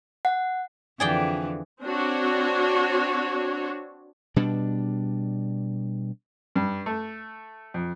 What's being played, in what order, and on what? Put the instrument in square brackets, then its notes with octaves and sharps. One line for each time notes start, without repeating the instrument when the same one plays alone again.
[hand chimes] F#5
[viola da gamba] F2 D3 E3 [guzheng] G#4 D5 G5
[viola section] C4 D4 F#4 C#5
[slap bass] B2 G3 D4
[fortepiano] G2
A3
F2